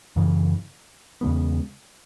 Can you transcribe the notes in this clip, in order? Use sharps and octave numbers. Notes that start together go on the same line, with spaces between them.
F#2 C#3 E3
E2 C#3 G#3 B3